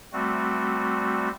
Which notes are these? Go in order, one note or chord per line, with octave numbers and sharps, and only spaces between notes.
G3 A3 C4 F#4